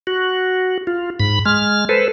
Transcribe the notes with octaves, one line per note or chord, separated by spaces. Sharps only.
F#4
F4
G#2 B5
G#3 F6
A4 B4 C5